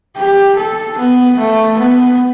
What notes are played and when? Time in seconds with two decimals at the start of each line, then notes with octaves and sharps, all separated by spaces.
0.17 G4
0.57 A4
0.98 B3
1.39 A3
1.79 B3